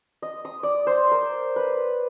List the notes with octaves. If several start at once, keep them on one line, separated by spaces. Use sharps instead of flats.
D#5
D#6
D5
C5
A#4
B4